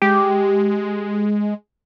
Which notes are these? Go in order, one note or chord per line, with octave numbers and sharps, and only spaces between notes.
G#3 G4